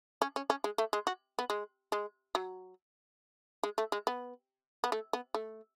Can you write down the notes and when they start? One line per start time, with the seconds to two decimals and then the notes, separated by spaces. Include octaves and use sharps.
0.22 C#4
0.36 C#4
0.50 C#4
0.64 G#3
0.78 A3
0.93 G#3
1.07 F#4
1.39 B3
1.50 G#3
1.92 G#3
2.35 F#3
3.63 G#3
3.78 A3
3.92 G#3
4.07 B3
4.84 B3
4.92 A3
5.13 B3
5.34 A3